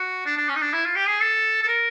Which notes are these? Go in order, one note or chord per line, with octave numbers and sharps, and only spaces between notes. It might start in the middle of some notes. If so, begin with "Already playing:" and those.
Already playing: F#4
D4
D4
C#4
D#4
D4
E4
F4
G4
G#4
A4
A4
A#4